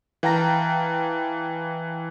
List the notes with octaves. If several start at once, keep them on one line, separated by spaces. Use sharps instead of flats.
E3 F5 G5 A5 A#5 A#6